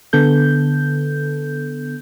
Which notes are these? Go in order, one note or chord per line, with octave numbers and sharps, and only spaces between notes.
D3 B3 A4 G6